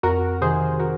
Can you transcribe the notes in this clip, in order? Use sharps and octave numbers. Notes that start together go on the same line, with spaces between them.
F2 F#4 A#4
C3 D#3 G#4 C5
F#4 A#4